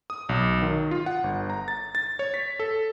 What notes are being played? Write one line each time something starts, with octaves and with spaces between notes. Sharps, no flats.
D#6
B1
D#3
F4
F#5
G1
A#5
A6
A6
C#5
B6
A4